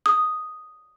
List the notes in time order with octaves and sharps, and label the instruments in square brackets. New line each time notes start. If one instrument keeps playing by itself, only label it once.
[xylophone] D#6